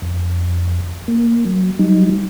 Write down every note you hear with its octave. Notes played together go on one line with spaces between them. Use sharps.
F2
A#3
F#3
F#3 G3 D#4